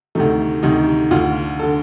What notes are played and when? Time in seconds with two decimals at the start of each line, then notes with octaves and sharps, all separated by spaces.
0.15 D2 C3 D#3 A3
0.63 D2 C3 D#3 D#4
1.11 D2 D3 F4
1.59 D3 A4